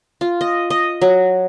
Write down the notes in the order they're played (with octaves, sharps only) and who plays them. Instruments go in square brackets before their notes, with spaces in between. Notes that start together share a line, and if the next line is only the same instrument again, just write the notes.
[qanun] F4
D#5
D#5
F#3